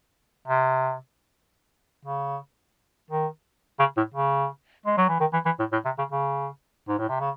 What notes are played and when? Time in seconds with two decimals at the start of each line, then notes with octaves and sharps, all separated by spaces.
0.47 C3
2.05 C#3
3.10 D#3
3.79 C#3
3.97 A2
4.14 C#3
4.86 G#3
4.97 F#3
5.09 E3
5.20 D#3
5.33 E3
5.46 E3
5.59 A2
5.72 A2
5.85 C3
5.98 C#3
6.12 C#3
6.89 G#2
6.99 A2
7.09 C3
7.20 C#3